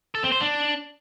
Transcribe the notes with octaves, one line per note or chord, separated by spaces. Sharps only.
A4
C4
C5
D4